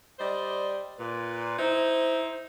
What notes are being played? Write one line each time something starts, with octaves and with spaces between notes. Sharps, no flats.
G3 C5 D5 D#5
A#2 B4
D#4 E4 C5